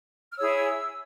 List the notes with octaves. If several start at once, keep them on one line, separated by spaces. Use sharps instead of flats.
F6
E4 G#4 C#5 E6